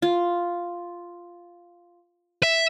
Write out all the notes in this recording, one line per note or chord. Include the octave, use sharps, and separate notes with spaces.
F4
E5